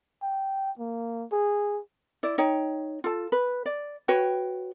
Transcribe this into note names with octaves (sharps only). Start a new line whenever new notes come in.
G5
A#3
G#4
E4 D5
D#4 C#5 G5
F4 A4 A5
B4
D5
F#4 B4 C#5 G5